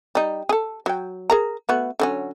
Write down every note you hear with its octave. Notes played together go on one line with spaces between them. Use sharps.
G3 D#4
G#4 A4
F#3 G5
G#4 A#4 A#5
A3 B3 F#4
D3 F#3 C#4